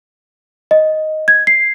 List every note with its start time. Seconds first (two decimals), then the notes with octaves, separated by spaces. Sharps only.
0.71 D#5
1.28 G#6
1.47 C7